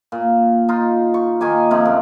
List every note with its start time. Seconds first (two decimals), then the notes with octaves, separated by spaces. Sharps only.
0.12 A#2
0.69 D#4 F4
1.14 C#6
1.41 D#3 A#3 G#5 D6
1.71 C3 F3 A3 C4
1.85 F#2